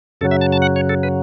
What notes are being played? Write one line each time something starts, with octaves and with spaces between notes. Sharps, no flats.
F#2 C#3 F#3 A4
E5
A5
A5
F#5
C#5
A4
B4